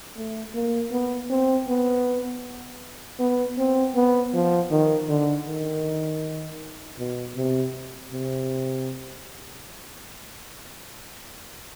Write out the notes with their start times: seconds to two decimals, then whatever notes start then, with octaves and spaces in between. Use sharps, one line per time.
0.17 A3
0.54 A#3
0.92 B3
1.30 C4
1.69 B3
3.20 B3
3.58 C4
3.95 B3
4.34 F3
4.71 D#3
5.09 D3
5.47 D#3
6.99 B2
7.37 C3
8.12 C3